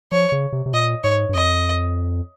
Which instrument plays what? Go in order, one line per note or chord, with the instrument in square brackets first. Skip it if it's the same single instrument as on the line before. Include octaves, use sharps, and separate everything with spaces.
[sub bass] F3 [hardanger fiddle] C#5
[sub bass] C#3
C3
C3
[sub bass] A#2 [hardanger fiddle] D#5
[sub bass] G#2 [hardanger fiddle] C#5
[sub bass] G2
[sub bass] F2 [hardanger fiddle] D#5